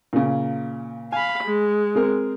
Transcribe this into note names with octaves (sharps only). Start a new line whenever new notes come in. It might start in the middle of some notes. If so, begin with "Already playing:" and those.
A#2 C#3
F5 G#5 B5
G#3
C4 G#4 A#4